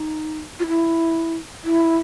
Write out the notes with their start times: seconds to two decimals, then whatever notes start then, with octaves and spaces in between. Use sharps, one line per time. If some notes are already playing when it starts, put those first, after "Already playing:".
Already playing: D#4
0.60 F4
0.68 E4
1.64 E4